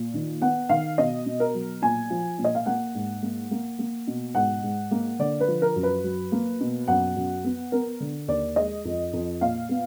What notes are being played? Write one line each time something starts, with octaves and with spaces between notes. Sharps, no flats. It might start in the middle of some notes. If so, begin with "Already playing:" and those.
Already playing: A#2
D#3
B3 F#5
D#3 F5
B2 D#5
B2
A#4
F#3
A#2 G#5
F3
A#2
D#5
F5
A#3 F#5
G#2
A#3
A#3
A#3
B2
G#2 F#5
G#2
A#3
D3 D5
B4
F3
A#4
F#2
B4
F#3
A#3
B2
F#2 F#5
F#2
B3
B3 A#4
D3
D#2 D5
G#3 D#5
F2
F2
A#2 F5
B3